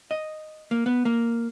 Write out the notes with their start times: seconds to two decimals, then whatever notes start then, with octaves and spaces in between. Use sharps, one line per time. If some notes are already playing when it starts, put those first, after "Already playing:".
0.11 D#5
0.71 A#3
0.86 B3
1.05 A#3